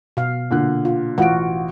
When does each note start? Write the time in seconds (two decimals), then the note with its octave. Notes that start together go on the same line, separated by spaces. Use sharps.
0.17 B2 F5
0.50 A#2 D3 F#6
0.85 F4
1.18 A1 F4 F#4 F#5 D7